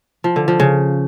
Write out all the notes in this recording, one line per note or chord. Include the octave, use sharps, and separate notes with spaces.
F3
D3
F3
C#3